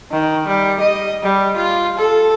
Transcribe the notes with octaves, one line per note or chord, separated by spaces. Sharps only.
D#3
G3
D#5
G3
F4
A4